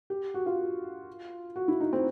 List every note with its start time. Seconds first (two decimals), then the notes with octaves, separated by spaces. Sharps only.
0.10 G4
0.34 F#4
0.46 F4
1.56 F#4
1.68 E4
1.80 D#4
1.93 C4